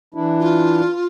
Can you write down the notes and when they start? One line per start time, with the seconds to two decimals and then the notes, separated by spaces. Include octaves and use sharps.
0.14 E3 D4 E4
0.40 F4